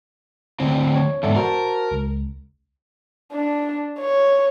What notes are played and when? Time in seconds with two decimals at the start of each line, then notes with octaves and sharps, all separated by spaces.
0.60 D2 C4
0.95 C#5
1.23 E2 G#2 A4 D5 E5
1.36 F#4 A#4 C5 A5
1.91 C#2
3.32 D4
4.00 C#5